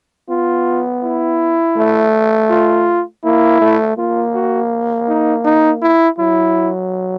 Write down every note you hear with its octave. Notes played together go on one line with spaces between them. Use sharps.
B3 F4
E4
A3
F4
A#3 E4
A3
A#3 F4
F#4
D#4
D#4
E4
F#3 E4